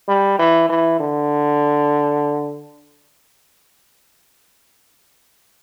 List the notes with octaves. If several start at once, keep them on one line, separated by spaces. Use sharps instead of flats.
G3
E3
E3
D3